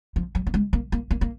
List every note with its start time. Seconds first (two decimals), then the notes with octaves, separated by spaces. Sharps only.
0.16 F3
0.35 F#3
0.47 A#3
0.54 G#3
0.73 A#3
0.92 A#3
1.11 A#3
1.21 A#3